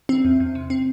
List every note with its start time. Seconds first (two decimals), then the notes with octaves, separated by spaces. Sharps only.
0.09 E3 C4
0.25 E2
0.40 E2
0.55 C3
0.70 C4